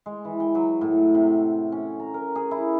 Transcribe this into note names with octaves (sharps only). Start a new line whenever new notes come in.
G#3
E3
G5
F#3
A2
C3
C#4
A#5
A#4
G#4
E4